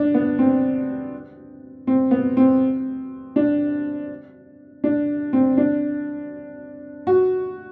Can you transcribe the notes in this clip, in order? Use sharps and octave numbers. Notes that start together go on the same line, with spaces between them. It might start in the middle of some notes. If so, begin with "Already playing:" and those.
Already playing: D4
B3
C4
C4
B3
C4
D4
D4
C4
D4
F#4